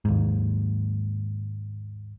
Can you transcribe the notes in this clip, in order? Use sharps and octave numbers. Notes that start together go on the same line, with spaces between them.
D#2 G#2